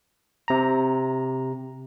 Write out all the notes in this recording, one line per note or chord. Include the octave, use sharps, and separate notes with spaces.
C3 A#5